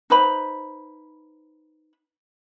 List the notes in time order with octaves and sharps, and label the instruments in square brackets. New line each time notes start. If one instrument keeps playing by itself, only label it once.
[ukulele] D#4 B4 C5 B5